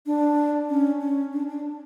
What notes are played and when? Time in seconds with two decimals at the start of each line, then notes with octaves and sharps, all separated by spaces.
0.06 D4
0.70 C#4
1.00 C#4
1.33 D4
1.48 D4